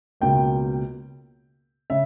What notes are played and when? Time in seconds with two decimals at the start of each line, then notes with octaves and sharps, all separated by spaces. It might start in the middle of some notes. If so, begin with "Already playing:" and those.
0.21 C#2 B2 A#3 G5
1.90 C#3 E5